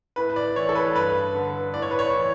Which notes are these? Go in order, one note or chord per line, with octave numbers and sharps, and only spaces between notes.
A2 B4
D5
E3 C#5
A4
B4
G2 B4
D3
A2 D5
C#5
B4
C#5
E3